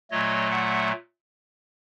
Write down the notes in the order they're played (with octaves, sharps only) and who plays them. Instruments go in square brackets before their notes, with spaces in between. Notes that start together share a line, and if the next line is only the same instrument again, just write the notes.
[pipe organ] A#2 F#3 A3 C#5 D#5
E5 F#5